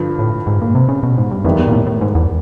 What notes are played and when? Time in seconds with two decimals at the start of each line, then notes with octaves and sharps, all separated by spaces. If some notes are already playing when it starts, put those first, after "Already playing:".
Already playing: G2 D3 F3
0.19 A2
0.47 G#2
0.61 A#2
0.75 C3
0.89 C#3
1.03 B2
1.18 G#2
1.31 G2
1.44 F2 D#3 G3 B3 E4
1.59 E2
1.68 A#2
1.73 A2
1.87 A2
2.01 G#2
2.15 E2